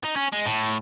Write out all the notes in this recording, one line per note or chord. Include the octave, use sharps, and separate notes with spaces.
D#4
C#4
G#3
A2